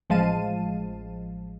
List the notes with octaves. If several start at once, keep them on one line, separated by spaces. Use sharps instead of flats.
A1 F3 G#3 F5 A5 D#7